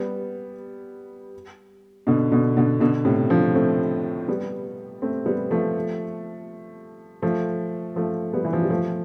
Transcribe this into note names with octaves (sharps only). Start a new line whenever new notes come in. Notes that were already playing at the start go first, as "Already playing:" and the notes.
Already playing: G3 B3
B2 D3
B2 D3
B2 D3
B2 D3
A2 C3
D3 F3
A3 C4
G3 B3
A3 C4
G3 B3
F3 A3
F3 A3
F3 A3
G3 B3
E3
F3
G3
F3 A3